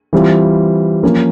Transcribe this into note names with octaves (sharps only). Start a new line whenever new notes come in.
E3 G3 C4 F4
F3 A#3 C#4